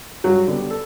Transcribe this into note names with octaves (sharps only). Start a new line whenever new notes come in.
G2 F#3 F#4
D3 G3 B3
A4